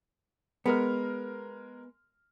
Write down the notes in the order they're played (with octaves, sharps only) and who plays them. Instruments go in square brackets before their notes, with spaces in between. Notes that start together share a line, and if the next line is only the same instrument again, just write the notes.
[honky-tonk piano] G#3 A#4 F6 [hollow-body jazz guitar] B3